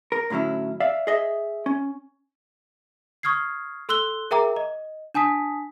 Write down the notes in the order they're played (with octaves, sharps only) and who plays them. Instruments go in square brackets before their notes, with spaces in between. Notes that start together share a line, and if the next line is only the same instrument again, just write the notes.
[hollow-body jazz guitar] A#4
A2 D3 F#3 C#4 E4
D5 E5 F5
G#4 D#5 E5
C#4
[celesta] C#6 D#6 F6 G#6 C7
A4 C6 E6 F#6 G7
G#4 A#4 E5 G5 A#5 D6
D#5
D4 G#5 A5 D#6 B6